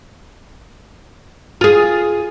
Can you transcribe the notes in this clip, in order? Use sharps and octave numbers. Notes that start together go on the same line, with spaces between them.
F4 G#4